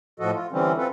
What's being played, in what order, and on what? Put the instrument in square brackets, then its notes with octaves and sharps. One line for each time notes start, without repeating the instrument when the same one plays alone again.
[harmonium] A2 F3 F#4 A4 D#5
F4
D3 E3 G3 C4 C#4
C4 F4 A4 B4